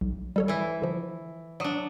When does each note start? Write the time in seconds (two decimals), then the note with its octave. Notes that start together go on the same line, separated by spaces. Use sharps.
0.01 B1
0.36 G3 A4 C#5
0.48 E3 E4
0.82 D3 F3
1.60 F#3 D4 D5 D#6 D#7